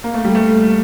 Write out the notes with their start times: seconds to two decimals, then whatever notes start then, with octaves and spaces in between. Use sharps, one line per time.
0.04 A#3
0.14 A3
0.25 G3
0.35 A3